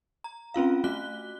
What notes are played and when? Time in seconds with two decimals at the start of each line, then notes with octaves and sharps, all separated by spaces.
0.24 A#5
0.54 C4 C#4 F4 F5
0.84 A3 F#4 F#6 G7